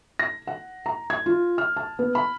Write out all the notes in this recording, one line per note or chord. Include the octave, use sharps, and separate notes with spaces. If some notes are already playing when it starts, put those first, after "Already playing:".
A#6
F#5
A#5
G#6
F4
F6
A5
B3
B5